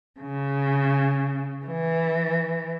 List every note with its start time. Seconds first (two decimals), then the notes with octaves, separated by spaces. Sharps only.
0.20 C#3
1.65 E3